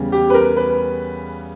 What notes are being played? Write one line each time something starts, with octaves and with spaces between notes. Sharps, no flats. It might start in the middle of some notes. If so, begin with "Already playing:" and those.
Already playing: E2 C#3 G3
G4
B4
A#4
B4